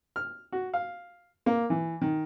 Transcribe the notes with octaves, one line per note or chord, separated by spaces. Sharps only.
F6
F#4
F5
A#3
E3
D#3